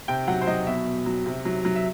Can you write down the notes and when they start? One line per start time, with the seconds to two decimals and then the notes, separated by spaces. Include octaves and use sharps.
0.08 C3 G5
0.28 F#3 F#5
0.41 C5
0.47 F#3 D#5
0.67 B2 E5
0.86 B2
1.06 F#3
1.26 C3
1.45 F#3
1.65 F#3
1.76 E5